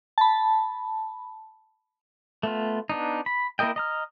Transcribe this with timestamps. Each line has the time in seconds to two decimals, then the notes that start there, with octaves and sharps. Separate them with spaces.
0.18 A5 B5
2.43 A3 B3 F4
2.90 B3 D4 D#4
3.26 B5
3.59 A#3 E4 A#4 D#5 G5
3.76 D#5 A#5 F6